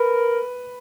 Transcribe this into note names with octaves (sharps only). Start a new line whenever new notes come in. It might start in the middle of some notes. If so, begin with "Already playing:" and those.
Already playing: A#4 B4